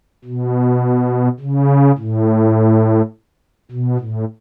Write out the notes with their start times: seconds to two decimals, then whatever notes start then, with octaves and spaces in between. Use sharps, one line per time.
0.25 B2
1.40 C#3
1.98 A2
3.71 B2
3.99 A2